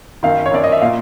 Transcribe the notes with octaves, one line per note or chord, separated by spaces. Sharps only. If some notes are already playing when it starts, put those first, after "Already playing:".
F#2 D#3 F5
C#5
F#2 D#3 D5
D#5
E5
A#2 F5